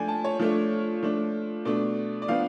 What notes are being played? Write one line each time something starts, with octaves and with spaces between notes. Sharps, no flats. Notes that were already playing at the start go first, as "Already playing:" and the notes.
Already playing: F3 A3 D4 G#5
A5
C#5
F3 A3 D4
F3 A3 D4
B2 A3 D4 D5
D5
F3 B3 D4 F5